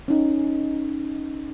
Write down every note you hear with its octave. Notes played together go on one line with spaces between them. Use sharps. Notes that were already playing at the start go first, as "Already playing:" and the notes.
C#4 D#4